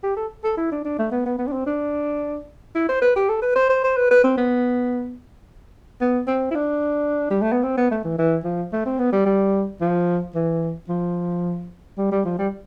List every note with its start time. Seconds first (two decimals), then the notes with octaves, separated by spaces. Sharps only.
0.03 G4
0.16 A4
0.44 A4
0.57 E4
0.72 D4
0.85 D4
0.99 A3
1.11 B3
1.26 B3
1.39 B3
1.47 D4
1.52 C4
1.66 D4
2.75 E4
2.89 C5
3.02 B4
3.16 G4
3.29 A4
3.42 B4
3.56 C5
3.69 C5
3.84 C5
3.96 B4
4.11 B4
4.24 C4
4.37 B3
6.01 B3
6.27 C4
6.51 E4
6.55 D4
7.30 G3
7.42 A3
7.52 B3
7.63 C4
7.77 B3
7.91 A3
8.05 E3
8.18 E3
8.44 F3
8.73 A3
8.86 C4
8.99 B3
9.12 G3
9.26 G3
9.81 F3
10.35 E3
10.89 F3
11.98 G3
12.11 G3
12.25 F3
12.38 G3